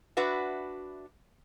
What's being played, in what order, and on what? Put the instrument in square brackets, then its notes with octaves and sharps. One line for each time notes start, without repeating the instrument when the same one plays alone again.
[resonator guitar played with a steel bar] D4 F#4 B4 E5